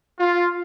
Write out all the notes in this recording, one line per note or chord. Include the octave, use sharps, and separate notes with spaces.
F4